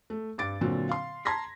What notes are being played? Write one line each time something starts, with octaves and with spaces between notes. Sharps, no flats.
A3
G2 D6 A6 D7
A#2 D3 F#3 C4
F5 C6
A5 A#5 C6 G#6 A#6 B6